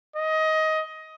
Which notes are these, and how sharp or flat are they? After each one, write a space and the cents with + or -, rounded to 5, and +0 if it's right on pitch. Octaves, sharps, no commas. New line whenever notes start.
D#5 +20